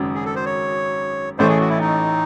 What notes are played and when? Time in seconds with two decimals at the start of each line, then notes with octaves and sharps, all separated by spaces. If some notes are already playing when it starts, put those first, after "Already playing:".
Already playing: G#1 F#2 C#3
0.15 G#4
0.25 A4
0.36 C5
0.46 C#5
1.39 A1 A2 E3 A3 C#4 C5
1.49 G#4
1.60 F#4
1.69 E4
1.80 D#4